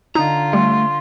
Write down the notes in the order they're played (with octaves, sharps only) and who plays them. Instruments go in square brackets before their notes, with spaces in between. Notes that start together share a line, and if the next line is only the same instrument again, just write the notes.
[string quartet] D3 F4 [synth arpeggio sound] D#4 [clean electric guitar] A#5
[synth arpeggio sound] G3 [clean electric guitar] A3 [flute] C6